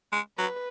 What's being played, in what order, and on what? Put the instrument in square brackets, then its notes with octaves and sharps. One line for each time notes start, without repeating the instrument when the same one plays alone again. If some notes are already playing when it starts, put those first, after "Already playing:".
[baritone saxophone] G#3
[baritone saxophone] F#3 [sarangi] B4